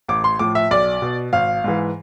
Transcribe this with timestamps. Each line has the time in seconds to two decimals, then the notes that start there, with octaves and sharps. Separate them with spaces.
0.08 A1 D6
0.24 C6
0.39 A2 F3 D6
0.55 E5
0.71 B1 D5
1.02 B2
1.33 G#1 F5
1.64 G#2 E3